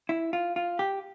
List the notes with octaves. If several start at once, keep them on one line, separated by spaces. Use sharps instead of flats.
E4
F4
F4
G4